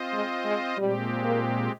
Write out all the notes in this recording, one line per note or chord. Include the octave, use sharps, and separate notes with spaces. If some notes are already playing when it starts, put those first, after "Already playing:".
Already playing: C4 F4 C5 D#5
G#3
G#3
A#2 G3 G#3 C4 G4
A#3